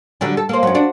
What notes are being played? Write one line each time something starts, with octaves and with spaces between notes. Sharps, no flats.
D3 F#3 G3
A4
A#3 C5
F#2 F#3
D4 F#4